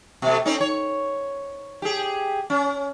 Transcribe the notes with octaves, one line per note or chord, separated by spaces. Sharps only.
B2 A3
C4 C#4 D#4
C#5
G4 G#4
C#4